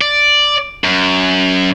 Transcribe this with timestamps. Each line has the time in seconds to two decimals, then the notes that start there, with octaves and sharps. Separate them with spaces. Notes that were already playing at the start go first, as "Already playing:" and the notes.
0.01 D5
0.84 F#2